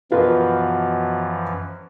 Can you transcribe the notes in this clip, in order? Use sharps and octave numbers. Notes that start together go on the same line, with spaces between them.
F#2 B2 E3 F3 F4 A#4 B4